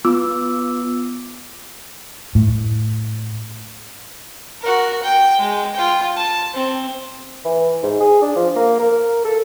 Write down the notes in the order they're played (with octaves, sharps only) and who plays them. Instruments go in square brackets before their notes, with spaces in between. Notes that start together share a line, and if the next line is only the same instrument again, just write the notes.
[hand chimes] B3 F4 D6 E6
[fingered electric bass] A2
[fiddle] F#4 A#4
G5
G#3
F4 G5
A5
C4
[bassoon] E3
G#2
G#4
D4
F3
A#3
A#4
A4